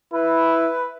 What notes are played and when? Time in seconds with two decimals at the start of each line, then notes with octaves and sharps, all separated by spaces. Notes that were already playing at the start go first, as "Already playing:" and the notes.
0.14 E4 B4